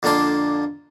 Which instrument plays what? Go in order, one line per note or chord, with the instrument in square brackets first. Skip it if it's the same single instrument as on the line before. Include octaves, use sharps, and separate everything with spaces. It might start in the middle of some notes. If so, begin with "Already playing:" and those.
[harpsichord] F2 D3 A#3 D4 C6